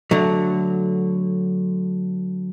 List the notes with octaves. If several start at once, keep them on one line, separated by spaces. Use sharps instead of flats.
D3 F#3 A3